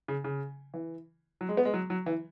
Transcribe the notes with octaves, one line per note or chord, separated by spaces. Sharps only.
C#3
C#3
E3
F#3
G#3
B3
G#3
F#3
F#3
E3